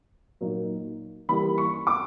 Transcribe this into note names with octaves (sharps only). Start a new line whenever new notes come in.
A#2 F#3 A#3 D#4
E3 G3 A#3 B5
C#6
D6